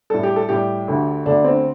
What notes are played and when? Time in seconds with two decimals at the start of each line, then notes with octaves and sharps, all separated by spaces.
0.10 A2 G3 A4
0.23 G4
0.36 A4
0.49 A2 G3 G4
0.88 D2 D3 A3
1.26 D2 D3 A3 D4
1.45 C4